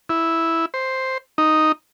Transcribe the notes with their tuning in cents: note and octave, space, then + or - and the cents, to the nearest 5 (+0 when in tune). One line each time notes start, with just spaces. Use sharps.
E4 -5
C5 +5
D#4 +0